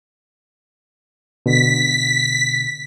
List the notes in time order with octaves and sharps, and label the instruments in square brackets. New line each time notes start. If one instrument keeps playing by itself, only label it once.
[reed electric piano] B2 D3 [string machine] B6